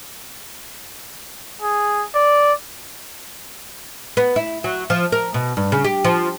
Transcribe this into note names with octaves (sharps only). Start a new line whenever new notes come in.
G#4
D5
B3
E4
F#3
F3
A#4
B2
G2
C#3
G4
F3